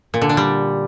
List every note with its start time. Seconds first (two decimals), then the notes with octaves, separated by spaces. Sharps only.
0.14 A#2
0.22 D3
0.29 D4
0.37 G3